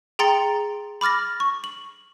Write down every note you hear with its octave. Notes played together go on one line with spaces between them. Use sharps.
G#4 G5 A#5 C6 A6 C#7
B5 D6 F6 A6 A#6
C#6
F#7